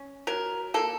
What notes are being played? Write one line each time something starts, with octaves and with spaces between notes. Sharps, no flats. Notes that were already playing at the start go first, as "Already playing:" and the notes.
Already playing: C#4
F#3 A#4
A#3 A4